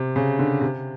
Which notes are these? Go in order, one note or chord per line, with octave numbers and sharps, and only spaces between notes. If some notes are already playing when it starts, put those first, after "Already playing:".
Already playing: C3
C#3
D3
C3